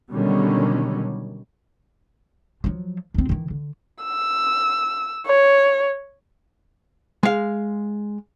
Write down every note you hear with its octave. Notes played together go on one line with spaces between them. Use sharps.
B2 D3 D#3 F#3 G3 C#4
F3 F#3
D2 C4
D#3 E3
D3
E6
C#5
G#3 F5